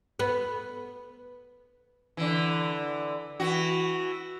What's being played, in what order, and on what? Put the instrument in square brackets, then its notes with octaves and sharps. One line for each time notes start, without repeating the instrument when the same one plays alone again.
[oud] B3
[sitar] D3 E3
E3 F#4